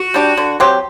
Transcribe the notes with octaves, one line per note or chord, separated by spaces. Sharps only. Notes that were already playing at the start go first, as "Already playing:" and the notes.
Already playing: F#4
G3 D4 G4
D3
F#3 C4 G4